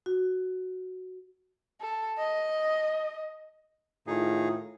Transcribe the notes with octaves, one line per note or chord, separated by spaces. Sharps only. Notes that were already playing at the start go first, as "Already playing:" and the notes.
F#4
A4
D#5
A2 D#3 D#4 F4 G#4